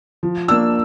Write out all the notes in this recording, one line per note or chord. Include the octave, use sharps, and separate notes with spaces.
F3
A#3 D4 E6